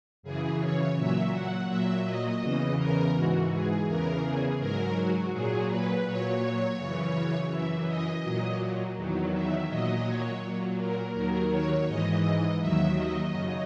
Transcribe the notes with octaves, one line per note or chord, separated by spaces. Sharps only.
F#2 C#3 E3 G#4
C#5
A#2 F#3 E5
F#5
A#2 F#3 E5
D#5
E2 C#3 E3
A#4
G#2 E3 F#4
G#4
E2 C#3 E3 A#4
G#4
G#2 F#3 A#4
F#4
A#2 F#3 G#4
B4
A#2 F#3 C#5
F#2 C#3 E3
F#2 E3 E5
D#5
A#2 F#3
E2 D#3 F#3
E5
A#2 F#3 D#5
C#5
A#2 F#3
A#4
D#2 D#3 F#3 A#4
C#5
G#2 D#5
E3
D#2 D#3 F#3 E5
D#5
F#2 C#3 F#3